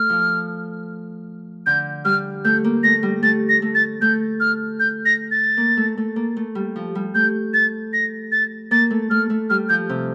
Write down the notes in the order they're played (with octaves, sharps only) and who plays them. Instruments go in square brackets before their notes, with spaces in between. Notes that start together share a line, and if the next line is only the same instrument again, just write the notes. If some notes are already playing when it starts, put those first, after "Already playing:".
Already playing: [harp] A3 [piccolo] F6
[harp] F3
[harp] D3 [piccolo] G6
[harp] G3 [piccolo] F6
[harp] A3 [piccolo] G6
[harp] A#3
[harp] A3 [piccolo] A#6
[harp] G3
[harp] A3 [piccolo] A6
[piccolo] A#6
[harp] A3
[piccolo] A6
[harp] A3 [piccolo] G6
[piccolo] F6
G6
A#6
A6
[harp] A#3
A3
A3
A#3
A3
G3
F3
G3
[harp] A3 [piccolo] G6
[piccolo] A6
A#6
A6
[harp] A#3 [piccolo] A6
[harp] A3
[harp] A3 [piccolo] F6
[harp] A3
[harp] G3 [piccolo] F6
[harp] F3 [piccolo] G6
[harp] C3